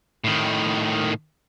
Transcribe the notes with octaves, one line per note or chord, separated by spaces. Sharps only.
A2 D#3